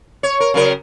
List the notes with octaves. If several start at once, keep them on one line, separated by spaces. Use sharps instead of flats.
C#5
A#4
C#3 F#3 A#4